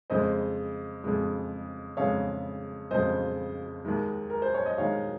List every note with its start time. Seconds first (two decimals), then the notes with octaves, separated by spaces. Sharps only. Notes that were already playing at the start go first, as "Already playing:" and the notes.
0.10 F2 C#3 G#3 C5 D#5
1.04 F2 C#3 G#3
1.97 F2 C#3 G#3 C#5 F5
2.91 F2 C#3 G#3 C5 D#5
3.85 D#2 D#3 G#3
4.30 A#4
4.42 C5
4.54 C#5
4.66 D#5
4.78 D#2 D#3 G#3 C#5 F5